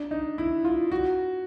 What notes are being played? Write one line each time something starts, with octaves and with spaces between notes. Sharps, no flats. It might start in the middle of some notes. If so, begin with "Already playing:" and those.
Already playing: D4
D#4
E4
F4
F#4